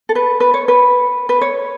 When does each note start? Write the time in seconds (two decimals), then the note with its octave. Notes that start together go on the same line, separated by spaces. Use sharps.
0.09 A4
0.15 B4
0.40 B4
0.54 C#5
0.68 B4
1.29 B4
1.41 C#5